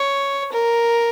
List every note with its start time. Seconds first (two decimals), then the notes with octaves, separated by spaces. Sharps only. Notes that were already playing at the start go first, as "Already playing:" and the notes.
Already playing: C#5
0.52 A#4